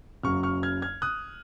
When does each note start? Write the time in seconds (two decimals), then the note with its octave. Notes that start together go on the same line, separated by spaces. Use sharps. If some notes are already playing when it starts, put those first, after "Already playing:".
0.23 F#1 F#2 C#3 F#3 C#6 F6
0.43 C#6 F6
0.63 F6 G#6
0.82 F6 G#6
1.02 D#6 F#6